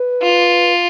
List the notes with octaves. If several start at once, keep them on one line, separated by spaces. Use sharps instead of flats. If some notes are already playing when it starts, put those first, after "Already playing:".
Already playing: B4
F4